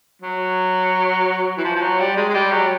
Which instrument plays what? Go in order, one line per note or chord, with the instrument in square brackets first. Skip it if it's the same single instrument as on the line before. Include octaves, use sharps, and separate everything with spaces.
[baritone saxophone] F#3
E3
F3
F3
F#3
G3
G#3
G#3
G3
F#3